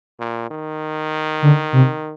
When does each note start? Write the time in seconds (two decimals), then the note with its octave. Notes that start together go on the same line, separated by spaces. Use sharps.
0.20 A#2
0.51 D#3
1.42 D3
1.73 C3